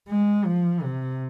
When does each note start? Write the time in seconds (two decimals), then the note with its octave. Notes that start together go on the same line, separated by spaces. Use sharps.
0.09 G#3
0.46 F3
0.83 C3